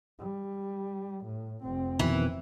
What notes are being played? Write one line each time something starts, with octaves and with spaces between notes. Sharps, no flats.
G3
A2
F1 C4
F2 B2 D#3 E3